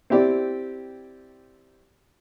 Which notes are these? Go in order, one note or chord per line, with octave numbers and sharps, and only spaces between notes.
C4 E4 G4 D5